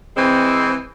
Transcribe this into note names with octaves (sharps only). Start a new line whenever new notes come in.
E3 G#3 C4